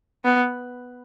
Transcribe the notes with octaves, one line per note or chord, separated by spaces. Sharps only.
B3